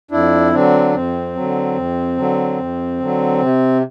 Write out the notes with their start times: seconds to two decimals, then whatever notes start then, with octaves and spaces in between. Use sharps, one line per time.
0.11 F2 D4 E4
0.52 D3 F#3 C4 D4
0.94 F2 C4
1.36 D3 F#3
1.76 F2
2.18 D3 F#3
2.58 F2
3.00 D3 F#3
3.42 C3